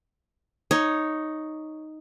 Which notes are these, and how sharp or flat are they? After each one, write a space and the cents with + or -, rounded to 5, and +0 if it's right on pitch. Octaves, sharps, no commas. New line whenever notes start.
D#4 +0 C#5 +0